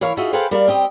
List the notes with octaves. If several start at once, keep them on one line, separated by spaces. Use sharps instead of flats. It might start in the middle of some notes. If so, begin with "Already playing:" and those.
E3 A#4 C#5 F5
D#4 F4 F#4 G#4 D#5 E5
G#4 A4 B4 C5 F5 G5
G3 A#4 D5 F5
C4 G4 D#5